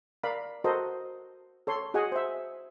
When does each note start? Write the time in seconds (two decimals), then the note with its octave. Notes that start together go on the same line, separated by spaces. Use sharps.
0.24 A#4 D5 F5 B5
0.64 F#4 A4 A#4 C5 D#5
1.67 A4 C#5 C6
1.94 F#4 G#4 D#5 F#5 G#5
2.12 C5 E5